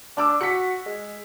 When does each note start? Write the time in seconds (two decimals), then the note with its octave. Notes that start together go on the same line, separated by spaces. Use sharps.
0.17 D4 A5 D6 E6
0.41 F#4 B6 C#7
0.86 G#3